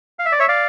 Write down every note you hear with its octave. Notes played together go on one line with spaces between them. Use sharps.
F5
E5
D5
C#5 E5
D5 F5